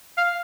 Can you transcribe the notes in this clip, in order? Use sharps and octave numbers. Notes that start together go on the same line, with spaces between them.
F5